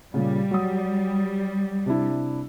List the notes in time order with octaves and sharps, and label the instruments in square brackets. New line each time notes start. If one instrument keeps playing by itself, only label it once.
[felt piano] A#2 C#3 [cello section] G3
[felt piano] F#3 D#6
C3 D4 E4